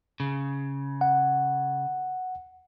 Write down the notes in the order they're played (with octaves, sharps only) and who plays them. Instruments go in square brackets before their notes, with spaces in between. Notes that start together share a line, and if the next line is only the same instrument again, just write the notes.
[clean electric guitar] C#3
[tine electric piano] F#5